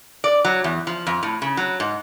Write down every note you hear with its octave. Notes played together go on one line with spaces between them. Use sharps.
D5
F#3
E2
F3
F2
A2
C#3
F#3
G#2